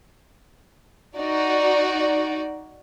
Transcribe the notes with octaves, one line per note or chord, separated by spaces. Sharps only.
D#4 F#4 D5